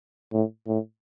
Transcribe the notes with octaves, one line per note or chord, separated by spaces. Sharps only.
A2
A2